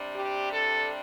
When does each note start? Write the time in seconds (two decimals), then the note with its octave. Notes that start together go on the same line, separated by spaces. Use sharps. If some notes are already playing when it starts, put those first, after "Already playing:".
Already playing: C3 G3 D4
0.15 G4
0.52 A4